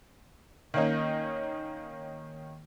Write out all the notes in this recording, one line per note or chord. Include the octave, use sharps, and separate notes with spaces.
D#3 A#3 C#4 D#4